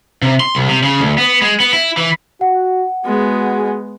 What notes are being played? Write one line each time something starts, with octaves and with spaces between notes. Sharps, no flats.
C3
C6
C2
C3
C#3
D2
B3
G#3
B3
E4
E3
F#4 F#5
G#3 B3 F#4 G#4